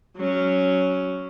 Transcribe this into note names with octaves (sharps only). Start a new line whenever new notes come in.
F#3 C#4